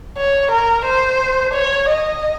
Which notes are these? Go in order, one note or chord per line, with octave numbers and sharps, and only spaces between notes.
C#5
A#4
C5
C#5
D#5